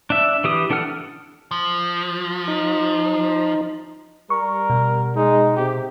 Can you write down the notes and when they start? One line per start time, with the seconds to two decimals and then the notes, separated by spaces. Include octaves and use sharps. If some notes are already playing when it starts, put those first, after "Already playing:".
0.10 D4 E5
0.44 E3 G4 D#6
0.70 E3 D4 A4 F#5 F6
1.51 F3
2.48 D#4
4.30 G3 A#4 C#6
4.70 B2
5.16 G#3 D#4
5.56 C3 G4